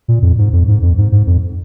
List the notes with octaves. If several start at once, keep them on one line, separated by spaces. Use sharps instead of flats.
A#2
F2
G#2
F2
G#2
F2
G#2
G#2
F2